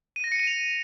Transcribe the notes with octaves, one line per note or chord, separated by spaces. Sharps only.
D#7
A#6
C#7
D#7
F7